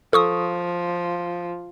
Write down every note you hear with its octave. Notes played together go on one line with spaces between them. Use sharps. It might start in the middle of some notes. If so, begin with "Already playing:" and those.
F3 A4 C#6 D#6